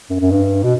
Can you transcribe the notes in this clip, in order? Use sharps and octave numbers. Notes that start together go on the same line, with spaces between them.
F#2
F#2
G2
B2